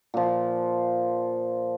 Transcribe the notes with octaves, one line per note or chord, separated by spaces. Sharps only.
A#2 F3